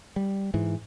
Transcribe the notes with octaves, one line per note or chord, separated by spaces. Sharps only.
G3
G#2 E3